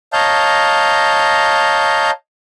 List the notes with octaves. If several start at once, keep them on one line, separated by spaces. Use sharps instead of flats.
C#5 D#5 F5 A5 A#5 G6